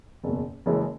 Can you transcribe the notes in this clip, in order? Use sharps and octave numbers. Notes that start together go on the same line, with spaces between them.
F#1 E2 B2
F#1 F#2 E3 G#3